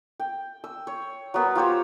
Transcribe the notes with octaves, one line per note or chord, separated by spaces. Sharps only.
G5
E6
C#5
F#3 B3 A#4
F4 G4 C5 C#5